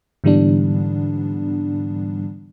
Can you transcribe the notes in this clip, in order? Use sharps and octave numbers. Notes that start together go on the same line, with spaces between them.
G#2 D3 E3 G3 B3 D4